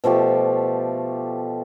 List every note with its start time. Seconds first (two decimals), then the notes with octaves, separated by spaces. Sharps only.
0.04 B2 F3 A3 G4